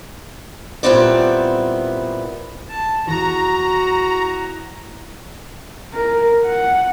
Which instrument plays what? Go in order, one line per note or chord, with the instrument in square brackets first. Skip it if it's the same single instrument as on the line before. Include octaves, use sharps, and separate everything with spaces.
[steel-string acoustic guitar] A#2 G3 B3 C4 E4 D5
[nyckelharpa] A5
[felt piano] E2 [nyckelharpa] F#4 [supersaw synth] A#5
[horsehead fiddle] A#4
F#5